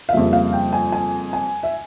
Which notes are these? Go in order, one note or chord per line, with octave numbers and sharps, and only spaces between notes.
F5
F2 C#3 G3 A#3 E5
F5
G5
G#5
G#5
G#5
E5